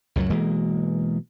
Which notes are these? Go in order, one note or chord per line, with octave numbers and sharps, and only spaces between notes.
C#2 F#2 E3 F#3
B1 E3 G#3 A#3